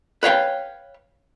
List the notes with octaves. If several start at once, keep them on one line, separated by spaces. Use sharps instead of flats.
B4 C#5 F5 G5